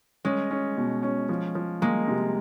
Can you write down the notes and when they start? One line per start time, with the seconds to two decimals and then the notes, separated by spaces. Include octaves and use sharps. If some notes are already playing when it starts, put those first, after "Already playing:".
0.25 G#3 C#4
0.51 C#4
0.77 B2
1.03 C#4
1.29 F3
1.55 F3
1.82 G#3 A#3
2.08 C3